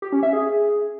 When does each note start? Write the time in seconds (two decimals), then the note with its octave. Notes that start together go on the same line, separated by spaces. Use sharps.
0.02 G4
0.12 C#4
0.23 E5
0.33 G#4